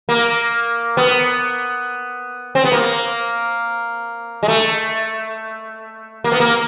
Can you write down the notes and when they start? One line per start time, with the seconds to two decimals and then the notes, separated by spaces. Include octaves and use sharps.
0.09 A#3
0.97 B3
2.55 C4
2.64 B3
2.72 A#3
4.43 G#3
4.48 A3
6.24 A#3
6.32 B3
6.40 A#3